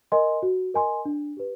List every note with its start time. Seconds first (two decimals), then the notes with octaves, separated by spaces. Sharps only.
0.12 A#4 D#5 G#5 C6
0.43 F#4
0.74 A#4 D#5 G#5 C6
1.05 D4
1.37 G4 B4